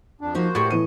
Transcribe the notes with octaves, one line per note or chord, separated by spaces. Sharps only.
F2 D4
F3 A#3 D#4 F#4 C5
A2 G4 C#5 D5
E3 D#5 D#7